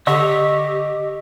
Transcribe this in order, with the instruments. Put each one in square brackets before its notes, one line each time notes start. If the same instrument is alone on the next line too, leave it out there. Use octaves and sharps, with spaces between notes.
[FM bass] D3 [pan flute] G4 [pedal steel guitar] D#5 C#6 E6